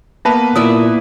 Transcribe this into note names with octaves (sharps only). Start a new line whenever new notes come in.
A#3 B3 B4 E5 A5 B5
A#2 E4 D5 E5 D#6